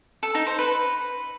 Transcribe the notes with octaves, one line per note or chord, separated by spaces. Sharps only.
A4
D#4
C5
B4